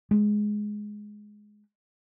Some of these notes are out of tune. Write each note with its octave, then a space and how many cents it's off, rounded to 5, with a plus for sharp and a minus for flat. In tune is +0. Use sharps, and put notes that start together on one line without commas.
G#3 +10